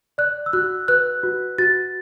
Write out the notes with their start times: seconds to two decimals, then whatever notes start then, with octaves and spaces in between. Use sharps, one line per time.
0.18 D5 F#6
0.46 E6
0.53 F#4 F#6
0.88 B4 F#6
1.23 F#4
1.58 F#4 A6